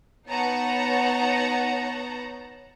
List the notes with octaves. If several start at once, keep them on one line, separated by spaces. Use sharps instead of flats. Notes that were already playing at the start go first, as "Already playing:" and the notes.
B3 D#4 C#5 F#5 A5 A#5